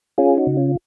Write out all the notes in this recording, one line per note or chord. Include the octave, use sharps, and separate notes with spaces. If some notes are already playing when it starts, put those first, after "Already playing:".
C#4 F4 G#4
D#4 F#4
C#3
C#4 F4